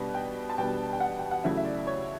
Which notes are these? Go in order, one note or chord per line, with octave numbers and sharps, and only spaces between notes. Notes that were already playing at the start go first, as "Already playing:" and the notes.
Already playing: B2 G3 B3 D4
G5
A5
B2 G3 B3 D4 G5
G5
F#5
G5
F#5
C#3 F#3 A3 E4 E5
E5
D5
C#5